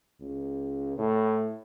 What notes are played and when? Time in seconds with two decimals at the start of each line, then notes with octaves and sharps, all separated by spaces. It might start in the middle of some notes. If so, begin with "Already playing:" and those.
0.21 C#2
0.98 A2